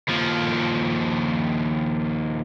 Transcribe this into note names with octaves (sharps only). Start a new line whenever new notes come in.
D#2 F3